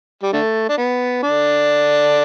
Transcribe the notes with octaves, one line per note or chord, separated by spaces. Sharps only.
G3
D3 A3
D4
B3
D3 D4